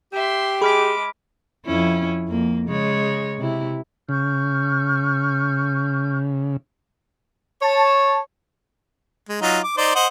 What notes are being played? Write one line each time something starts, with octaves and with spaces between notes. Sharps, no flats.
G4 E5 C6
G#3 G#4 B5 D6 F6 B6
F2 C#4 E4
F2 A#3
C#3 G#3 C#5
C3 E4
C#3 C#6 F6 G6
C#5 A5
G#3
F#3 D#4 F4
D6
D#4 C5 D5
C5 D#5 F#5